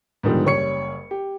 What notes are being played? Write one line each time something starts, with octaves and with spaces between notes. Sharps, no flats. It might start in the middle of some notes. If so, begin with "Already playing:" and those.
G#2 B2 D3 D#3 F3 G3
F#1 G3 C#5 C#6 C#7
G4